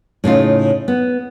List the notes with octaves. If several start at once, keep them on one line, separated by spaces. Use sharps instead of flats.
A2 C#3 D#4 F4
B3